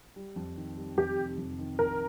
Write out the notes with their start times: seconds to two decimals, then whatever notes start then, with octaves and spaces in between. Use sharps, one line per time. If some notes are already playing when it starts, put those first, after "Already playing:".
0.16 G3
0.36 F2
0.56 D#3
0.77 G3
0.97 F2 G4
1.18 F1
1.38 F2
1.59 D#3
1.79 A#1 A#4